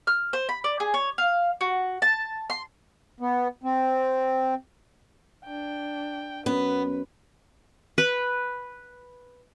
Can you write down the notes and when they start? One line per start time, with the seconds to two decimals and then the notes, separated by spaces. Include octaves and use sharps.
0.07 F6
0.33 C5
0.49 B5
0.64 D5
0.80 G#4
0.94 C#5
1.18 F5
1.61 F#4
2.02 A5
2.50 C6
3.20 B3
3.63 C4
5.45 D4 G5
6.46 F#2 B3 B4
7.98 B4